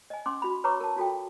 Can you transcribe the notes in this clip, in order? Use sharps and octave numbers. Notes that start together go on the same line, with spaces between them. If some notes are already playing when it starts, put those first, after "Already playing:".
D#5 G#5
C#4 C6 D6
F#4 B5
B4 C#5 A#5 B5 C#6 D6
A#4 A5
F4 F#4 A4 G5